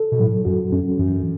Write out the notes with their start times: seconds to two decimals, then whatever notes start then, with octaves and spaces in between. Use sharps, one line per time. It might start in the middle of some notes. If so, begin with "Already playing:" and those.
Already playing: A4
0.12 B2
0.20 A2 F#3
0.45 F#2 F#4
0.72 F#2 C#4
0.98 F#2 E3